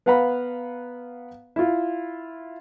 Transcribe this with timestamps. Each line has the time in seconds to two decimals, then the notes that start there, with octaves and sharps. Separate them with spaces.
0.06 B3 B4 F5 F#5 A#5 B5
1.56 E4 F4